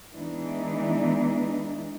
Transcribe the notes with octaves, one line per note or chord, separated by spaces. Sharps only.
E3 G#3 B3 D4 D#4